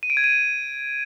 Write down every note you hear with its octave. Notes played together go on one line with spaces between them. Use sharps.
D#7
D7
G#6
D#7